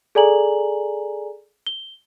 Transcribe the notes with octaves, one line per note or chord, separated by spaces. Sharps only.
G#4 A4 D5 G#5 A#5 F#7
G7